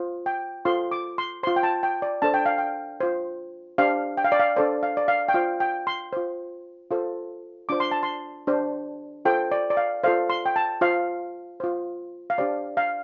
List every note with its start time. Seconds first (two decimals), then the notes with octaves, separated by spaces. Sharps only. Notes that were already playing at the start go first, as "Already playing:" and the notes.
Already playing: F4 C5
0.26 G5
0.65 F4 A4 C5 C6
0.92 D6
1.18 C6
1.43 F4 C5 C6
1.56 G5
1.63 A5
1.83 G5
2.02 D5
2.22 D4 A4 C5 A5
2.34 G5
2.46 F5
2.58 G5
3.00 F4 C5
3.78 D4 G4 C5 F5
4.17 G5
4.24 F5
4.32 D5
4.40 F5
4.56 D4 A4 C5 D5
4.83 F5
4.97 D5
5.08 F5
5.28 G5
5.34 F4 C5 F5
5.60 G5
5.87 C6
6.13 F4 C5
6.91 F4 A4 C5
7.69 D4 F4 C5 D6
7.80 C6
7.91 A5
8.03 C6
8.47 D4 G4 C5
9.25 F4 A4 C5 G5
9.52 D5
9.70 D5
9.77 F5
10.04 F4 A4 C5 F5
10.30 C6
10.46 G5
10.56 A5
10.81 F4 C5 F5
11.60 F4 C5
12.30 F5
12.38 D4 G4 C5 D5
12.77 F5